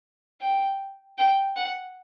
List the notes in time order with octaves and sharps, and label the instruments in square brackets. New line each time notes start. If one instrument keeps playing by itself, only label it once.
[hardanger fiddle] G5
G5
F#5